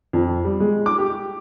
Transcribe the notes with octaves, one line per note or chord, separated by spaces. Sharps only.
F2
G3
G#3
D6
G4